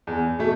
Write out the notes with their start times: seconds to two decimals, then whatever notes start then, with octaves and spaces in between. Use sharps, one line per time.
0.07 E2
0.39 B2 A3